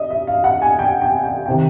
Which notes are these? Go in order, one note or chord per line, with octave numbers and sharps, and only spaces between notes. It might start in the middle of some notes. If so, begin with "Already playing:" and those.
Already playing: D#5 E5
E5
F5
F#5
G#5
G5
G5
G5
G5
C3 D#3